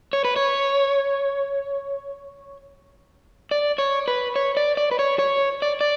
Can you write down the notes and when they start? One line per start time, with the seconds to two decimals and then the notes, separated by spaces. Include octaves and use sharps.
0.13 C#5
0.24 B4
0.36 C#5
3.51 D5
3.78 C#5
4.08 B4
4.36 C#5
4.57 D5
4.77 D5
4.91 B4
4.99 C#5
5.19 C#5
5.62 D5
5.81 D5